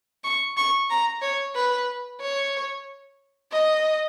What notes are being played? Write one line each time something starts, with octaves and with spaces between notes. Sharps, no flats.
C#6
C#6
A#5
C#5
B4
C#5
D#5